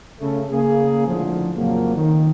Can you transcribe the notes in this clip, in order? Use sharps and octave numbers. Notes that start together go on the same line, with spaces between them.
C#3 A3
C#3 A#3 G#4
C#2 A2 D3 F3
F2 A#2 C#3 F3 F#3 A#3
D#3